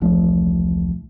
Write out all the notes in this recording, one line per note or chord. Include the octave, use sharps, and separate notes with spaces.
E1 C2 F3 A3